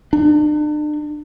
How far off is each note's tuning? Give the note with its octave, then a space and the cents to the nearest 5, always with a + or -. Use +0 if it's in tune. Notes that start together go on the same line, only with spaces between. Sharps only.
D4 +40